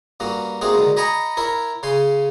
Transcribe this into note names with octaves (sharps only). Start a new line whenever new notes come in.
G2 A#3 C#4 F#4
A3 A#3 C4 D#4 F#4 G#4
D3 D#3 F#3 G#3
D#5 G5 G#5 A#5 B5 C#6
E4 A#4 C#5 E5
C#3 C#4 G#5 C6